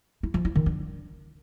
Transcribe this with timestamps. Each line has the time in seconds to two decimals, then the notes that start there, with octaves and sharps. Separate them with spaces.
0.23 E4
0.34 F3
0.45 E4
0.55 D#3
0.66 D4